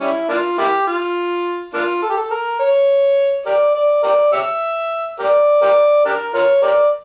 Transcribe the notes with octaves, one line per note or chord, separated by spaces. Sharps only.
G3 C#4 E4
A#3 D4 F4
A#3 E4 G4
F4
A#3 D4 F4
A4
G4
A4
A#4
C#5
G4 A#4 D5
D5
G4 A#4 D5
G4 C#5 E5
G4 A#4 D5
G4 A#4 D5
D4 G4 A#4
F4 A#4 C#5
G4 A#4 D5